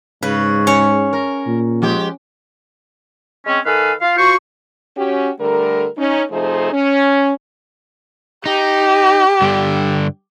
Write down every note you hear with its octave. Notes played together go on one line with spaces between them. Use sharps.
G#2 C#3 B4
C#4 C#5
A#4
A#2
F3 G#3 G4
G#3 C4 C#4
D#3 A4 B4 F5 G#5
F4 F5
F4 F#4 C5 C#6
C#4 F#4 G4
D3 G3 A3 A#4
C#4 D#4
C3 F3 A3 D#4 G#4 C5
C#4
D#4 G4
G2 D3